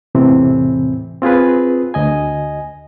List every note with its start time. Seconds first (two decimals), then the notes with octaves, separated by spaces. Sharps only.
0.15 E2 A2 C3 E3 C4
1.22 C4 F4 G#4 B4
1.94 D2 D#5 G#5